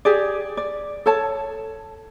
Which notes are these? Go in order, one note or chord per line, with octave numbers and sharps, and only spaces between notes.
G4 G#4 D5
D5
A4 C#5 A5